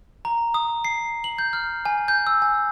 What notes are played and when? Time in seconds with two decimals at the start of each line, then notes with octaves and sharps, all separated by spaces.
0.25 A#5
0.54 D#6
0.85 C7
1.24 F#7
1.39 G6
1.53 F6
1.85 G#5
2.08 G6
2.27 E6
2.42 G#5